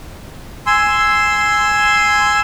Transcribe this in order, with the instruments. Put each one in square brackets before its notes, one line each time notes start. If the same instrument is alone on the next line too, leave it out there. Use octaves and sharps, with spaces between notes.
[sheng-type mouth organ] G#5 C6 E6